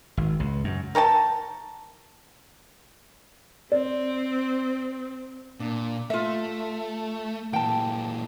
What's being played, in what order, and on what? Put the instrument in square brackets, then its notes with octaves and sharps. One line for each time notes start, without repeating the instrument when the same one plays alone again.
[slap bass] G#1
C#2
F#2
[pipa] A#4 C#5 G5 A5
[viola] C4 [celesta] D5
[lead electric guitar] A#2 [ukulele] D4
[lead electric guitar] A3 [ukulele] F4 E5
[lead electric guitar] A#2 E3 [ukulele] G5 A5